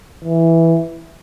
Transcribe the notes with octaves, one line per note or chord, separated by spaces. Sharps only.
E3